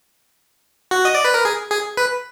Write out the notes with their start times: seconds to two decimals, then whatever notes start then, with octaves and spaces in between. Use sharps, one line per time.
0.91 F#4
1.05 D#5
1.15 D5
1.25 B4
1.34 A#4
1.45 G#4
1.71 G#4
1.97 B4